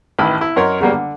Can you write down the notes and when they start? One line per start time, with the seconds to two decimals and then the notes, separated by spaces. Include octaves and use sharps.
0.19 A1 D#3 E4 B5
0.41 E4
0.56 F#2 A#4 C#5 D#5 C6
0.80 C#3 F#3 G3 A#3
0.92 D3